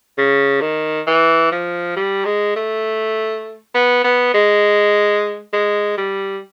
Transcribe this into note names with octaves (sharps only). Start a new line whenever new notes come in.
C#3
D#3
E3
F3
G3
G#3
A3
B3
B3
G#3
G#3
G3